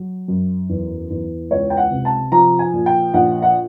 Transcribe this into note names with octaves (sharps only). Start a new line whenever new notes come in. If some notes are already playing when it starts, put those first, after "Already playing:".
Already playing: F#3
F#2
E2
E2
C#2 C#5
G5
F#5
C3
A5
F3 A#5
G#5
A#2
G5
A#1 F#5
F#5